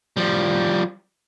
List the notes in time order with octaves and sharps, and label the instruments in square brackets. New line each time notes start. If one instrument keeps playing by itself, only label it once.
[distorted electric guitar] F3 G3